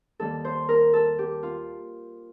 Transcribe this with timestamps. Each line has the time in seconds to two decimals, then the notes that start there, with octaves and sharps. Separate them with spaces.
0.20 D#2 D#3 G3 A4
0.45 C5
0.69 A#4
0.93 A4
1.19 G4
1.43 F4